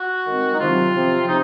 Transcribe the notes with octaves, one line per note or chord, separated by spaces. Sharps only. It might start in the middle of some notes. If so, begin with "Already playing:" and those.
Already playing: F#4
D#3 G#3 C4
D#4
C3 D#3 F#3 C4 F4
C3 F3 C4
C3 D#4